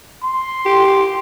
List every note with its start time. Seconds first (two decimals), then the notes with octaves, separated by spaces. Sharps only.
0.24 C6
0.66 G4